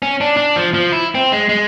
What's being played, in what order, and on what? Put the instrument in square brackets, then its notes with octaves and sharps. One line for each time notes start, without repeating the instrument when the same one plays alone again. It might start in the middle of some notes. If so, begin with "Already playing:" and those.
[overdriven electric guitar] C#4
D4
D4
F3
F3
E4
C4
G#3
G#3